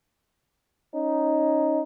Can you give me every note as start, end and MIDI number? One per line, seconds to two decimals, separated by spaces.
0.95 1.82 61
0.95 1.82 63